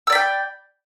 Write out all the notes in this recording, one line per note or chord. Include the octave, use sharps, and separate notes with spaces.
D5 G5 B5 E6